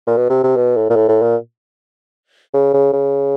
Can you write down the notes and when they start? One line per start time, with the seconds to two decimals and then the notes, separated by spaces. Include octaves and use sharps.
0.07 A#2
0.17 B2
0.29 C3
0.43 C3
0.56 B2
0.76 A2
0.89 A#2
0.96 A2
1.08 A2
1.22 A#2
2.54 C#3
2.74 C#3
2.93 C#3